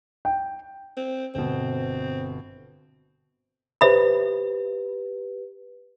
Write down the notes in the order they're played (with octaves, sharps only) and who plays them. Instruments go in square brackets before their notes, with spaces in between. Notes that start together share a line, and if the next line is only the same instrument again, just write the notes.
[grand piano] G5
[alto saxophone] C4
[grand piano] G1 B2 [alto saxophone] C4
[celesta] G4 B4 [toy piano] C5 E5 B5